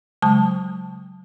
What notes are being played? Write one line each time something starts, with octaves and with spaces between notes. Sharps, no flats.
C#3 F#3 G#3 A5 D#6